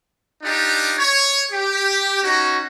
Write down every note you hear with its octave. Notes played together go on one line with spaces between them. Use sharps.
D4 D#4 F4 G4
C#5
G4
C#4 D#4 F#4